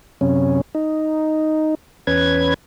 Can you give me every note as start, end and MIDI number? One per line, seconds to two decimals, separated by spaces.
0.21 0.61 42
0.21 0.61 48
0.21 0.61 61
0.75 1.75 63
2.07 2.54 40
2.07 2.54 61
2.07 2.54 71
2.07 2.54 92